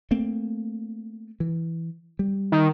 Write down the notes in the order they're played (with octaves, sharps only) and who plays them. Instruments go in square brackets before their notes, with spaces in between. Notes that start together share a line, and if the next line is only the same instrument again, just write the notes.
[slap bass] A3 A#3 C4
E3
G3
[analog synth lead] D#3